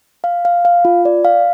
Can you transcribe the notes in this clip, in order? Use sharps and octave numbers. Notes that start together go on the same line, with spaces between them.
F5
F5
F5
F4
D5
F5